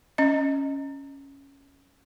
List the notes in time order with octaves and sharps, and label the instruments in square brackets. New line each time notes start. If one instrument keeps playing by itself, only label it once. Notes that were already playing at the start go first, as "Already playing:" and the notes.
[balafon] C#4 D#5